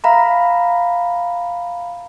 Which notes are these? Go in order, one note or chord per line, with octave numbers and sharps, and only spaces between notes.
E5 F5 A#5 B5